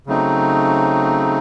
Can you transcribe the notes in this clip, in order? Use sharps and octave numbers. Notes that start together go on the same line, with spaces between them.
C#3 F#3 A3 C4 D#4